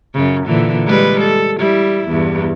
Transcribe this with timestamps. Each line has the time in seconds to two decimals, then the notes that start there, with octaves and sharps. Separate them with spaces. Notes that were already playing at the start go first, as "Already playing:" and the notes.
0.14 F#2 C#3
0.47 A#2 D3 E3
0.86 G3 G#3 B4
1.21 A4
1.59 G3 E4
2.09 E2 G2